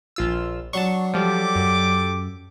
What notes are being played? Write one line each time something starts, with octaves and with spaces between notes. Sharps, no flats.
A#1 F4 E6
F#3 D4 A5 C6 C#6
F3 G3 G4 A4 D6
F#2